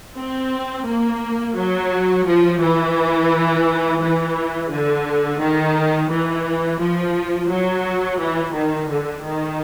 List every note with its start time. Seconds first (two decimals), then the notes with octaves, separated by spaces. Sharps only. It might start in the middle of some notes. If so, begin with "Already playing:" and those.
0.17 C4
0.86 A#3
1.56 F#3
2.27 F3
2.61 E3
4.01 E3
4.70 D3
5.40 D#3
6.10 E3
6.80 F3
7.50 F#3
8.20 E3
8.55 D#3
8.89 D3
9.25 D#3